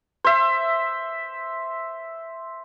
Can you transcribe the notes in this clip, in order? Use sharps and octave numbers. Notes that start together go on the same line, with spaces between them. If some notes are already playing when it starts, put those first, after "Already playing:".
C5 E5